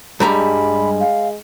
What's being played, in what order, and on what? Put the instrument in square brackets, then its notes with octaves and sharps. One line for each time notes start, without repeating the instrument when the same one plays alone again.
[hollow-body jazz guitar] G2 G3 A#5 [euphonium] G#3 [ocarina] B5
[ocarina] F5